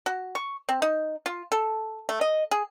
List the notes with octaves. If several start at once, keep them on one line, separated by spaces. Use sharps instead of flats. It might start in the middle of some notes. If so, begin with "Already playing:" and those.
F#4
C#6
C4
D#4
F4
A4
A3
D#5
G#4